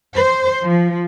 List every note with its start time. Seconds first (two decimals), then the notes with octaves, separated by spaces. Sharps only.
0.13 C5
0.64 F3